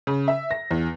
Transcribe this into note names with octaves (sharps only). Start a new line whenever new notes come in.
C#3
E5
A#6
E2